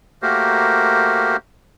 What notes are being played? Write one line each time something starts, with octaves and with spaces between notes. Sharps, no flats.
A3 A#3 F#4 G4 A#4 C5